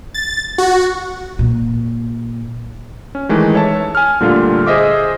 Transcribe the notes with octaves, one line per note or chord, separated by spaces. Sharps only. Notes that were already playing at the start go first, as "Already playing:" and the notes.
A6
F#4
A#2
C#4
D#3 E3 G#3 A3
C#5 E5 A5
G#5 F6
A#2 D3 G3 A3 F4
G#4 C5 D#5 E5 D6